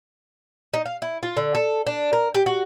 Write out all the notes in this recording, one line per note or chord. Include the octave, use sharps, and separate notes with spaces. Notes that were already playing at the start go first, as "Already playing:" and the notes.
D#4
F5
E4
F4
D3
A4
D4
A#4
G4
F#4